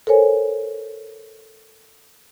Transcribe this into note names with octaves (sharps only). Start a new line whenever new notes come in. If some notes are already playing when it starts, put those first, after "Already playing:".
A4 A#4 C5 C#5 G#5